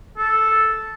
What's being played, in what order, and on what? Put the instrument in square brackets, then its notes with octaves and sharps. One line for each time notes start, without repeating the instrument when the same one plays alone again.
[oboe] A4